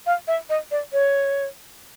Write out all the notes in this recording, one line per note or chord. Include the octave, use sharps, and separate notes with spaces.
F5
E5
D#5
D5
C#5